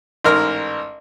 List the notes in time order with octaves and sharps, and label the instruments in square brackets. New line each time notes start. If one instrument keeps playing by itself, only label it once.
[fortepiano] A1 G#2 A#4 F6